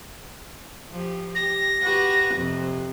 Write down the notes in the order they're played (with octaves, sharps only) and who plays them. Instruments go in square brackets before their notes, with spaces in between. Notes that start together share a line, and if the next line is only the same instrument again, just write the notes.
[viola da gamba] F3 G4
[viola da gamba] G4 [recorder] A#6
[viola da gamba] F#4 G4 B4
F2 C3